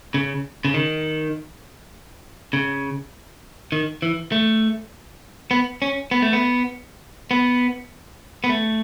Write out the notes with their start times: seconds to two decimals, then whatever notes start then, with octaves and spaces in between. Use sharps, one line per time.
0.14 C#3
0.65 C#3
0.74 D#3
2.53 C#3
3.72 D#3
4.02 E3
4.32 A3
5.51 B3
5.82 C#4
6.11 B3
6.22 A3
6.33 B3
7.31 B3
8.44 B3
8.49 A3